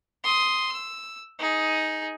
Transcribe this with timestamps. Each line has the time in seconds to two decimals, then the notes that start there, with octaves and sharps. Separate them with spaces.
0.24 C6 D#6
0.72 E6
1.39 D#4 G#4